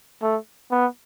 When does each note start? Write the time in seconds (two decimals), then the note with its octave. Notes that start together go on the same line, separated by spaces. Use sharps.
0.22 A3
0.71 B3